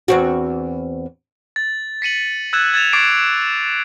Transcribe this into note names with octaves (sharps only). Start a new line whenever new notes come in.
E2 C4 F#4
A6
B6 C#7 D#7 F#7
E6 F#6 G#6 A6 E7
G#6 A6 E7 F7
C#6 D6 A6 C7 D7 E7